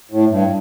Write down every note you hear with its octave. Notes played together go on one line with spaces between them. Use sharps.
A2
G2